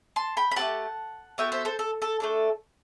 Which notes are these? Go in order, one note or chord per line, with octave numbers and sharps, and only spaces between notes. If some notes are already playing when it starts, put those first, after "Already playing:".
A5 C6
G5 B5
B5
A3 C4 G4 F#5 A5
B3 F#4 A4 E5 G5
C5 E5
A4 C5
A4
A4
A3 D4 A4